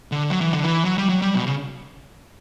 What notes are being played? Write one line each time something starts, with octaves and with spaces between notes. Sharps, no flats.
D3
F#3
E3
D3
E3
F#3
G3
F#3
G3
B2
C#3